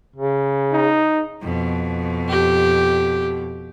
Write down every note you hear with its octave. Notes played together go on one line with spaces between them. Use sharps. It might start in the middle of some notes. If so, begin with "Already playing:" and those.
C#3
D#4
F2 B2
G4